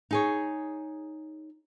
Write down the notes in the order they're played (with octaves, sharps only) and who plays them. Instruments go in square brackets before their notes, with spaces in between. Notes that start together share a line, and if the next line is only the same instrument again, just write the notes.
[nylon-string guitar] D#4 G#4 C#5